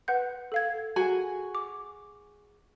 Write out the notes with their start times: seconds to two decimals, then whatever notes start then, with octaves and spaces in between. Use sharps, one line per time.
0.08 B4 F#5 G6
0.52 A4 F5 G#6
0.96 F#4 G#4 G#5
1.55 D6